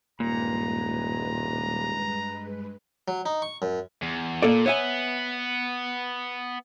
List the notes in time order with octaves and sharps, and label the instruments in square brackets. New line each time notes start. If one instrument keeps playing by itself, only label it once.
[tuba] D#1 [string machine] G2 G#3 B4 [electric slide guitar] A#2 [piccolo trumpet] A#5
[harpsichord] F#3
D#4
C#6
F#2
[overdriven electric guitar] E2
[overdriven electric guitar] A#2 [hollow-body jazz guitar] A#3 A4 D5
[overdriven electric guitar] B3 [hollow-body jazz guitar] C#5 E5 G#5